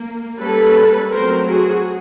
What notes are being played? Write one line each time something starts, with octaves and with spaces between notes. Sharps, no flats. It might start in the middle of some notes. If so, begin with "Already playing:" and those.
Already playing: A#3
G3 A#3 C#4 A4 B4
F#3 A3 C4 A#4 C5
F#4 G#4